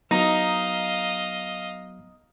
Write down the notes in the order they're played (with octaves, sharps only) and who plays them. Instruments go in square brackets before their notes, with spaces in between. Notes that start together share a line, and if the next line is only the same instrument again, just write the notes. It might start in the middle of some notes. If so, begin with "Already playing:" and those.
[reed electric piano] F#3 B3 [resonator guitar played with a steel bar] D#4 [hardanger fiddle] D#5 F5 [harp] A#5